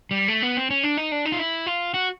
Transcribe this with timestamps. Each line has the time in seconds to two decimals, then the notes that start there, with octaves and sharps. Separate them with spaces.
0.11 G3
0.28 A3
0.42 B3
0.57 C4
0.70 C#4
0.84 D4
0.97 D#4
1.12 D4
1.25 D#4
1.32 F4
1.39 E4
1.66 F4
1.94 F#4